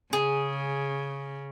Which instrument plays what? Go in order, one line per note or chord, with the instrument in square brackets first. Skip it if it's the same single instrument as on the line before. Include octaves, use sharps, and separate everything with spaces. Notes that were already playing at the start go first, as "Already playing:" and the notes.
[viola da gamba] C#3 [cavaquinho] G#4